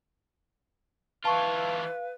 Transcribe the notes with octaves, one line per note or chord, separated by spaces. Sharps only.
E3 F4 B4 F5 A5 C#6